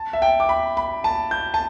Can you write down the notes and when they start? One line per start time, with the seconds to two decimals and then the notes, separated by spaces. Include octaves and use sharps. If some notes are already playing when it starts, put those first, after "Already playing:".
Already playing: A5
0.13 E5
0.22 G5
0.40 D6
0.49 B5
0.77 B5
1.04 A5
1.31 G6
1.54 A5